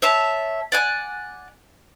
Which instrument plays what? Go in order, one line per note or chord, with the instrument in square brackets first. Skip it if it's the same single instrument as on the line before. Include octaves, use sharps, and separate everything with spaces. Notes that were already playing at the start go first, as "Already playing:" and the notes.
[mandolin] C#5 E5 A5
D5 F#5 G#5